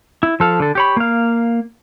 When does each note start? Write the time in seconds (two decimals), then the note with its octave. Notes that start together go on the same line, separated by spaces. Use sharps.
0.23 E4
0.40 F3 A4 F5
0.60 D3 A4
0.75 G4 C#5 B5
0.97 A#3 F5